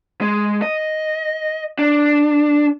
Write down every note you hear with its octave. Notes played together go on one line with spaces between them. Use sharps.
G#3
D#5
D4